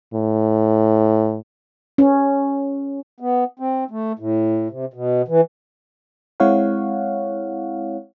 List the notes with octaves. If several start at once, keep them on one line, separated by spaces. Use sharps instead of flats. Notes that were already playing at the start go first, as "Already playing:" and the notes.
A2
C#4
B3
C4
A3
A2
C3
B2
E3
G#3 C4 E4 C#5 F5 F#5